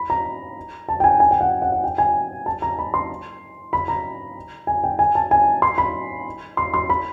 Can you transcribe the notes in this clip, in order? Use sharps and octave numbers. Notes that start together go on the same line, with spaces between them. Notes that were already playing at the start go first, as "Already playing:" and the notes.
Already playing: B5
A#5
A5
G5
G#5
G#5
G5
F#5
F#5
F#5
G5
G#5
A5
A#5
B5
C6
B5
A#5
G#5
G5
G#5
A5
G#5
C6
B5
C6
C6
B5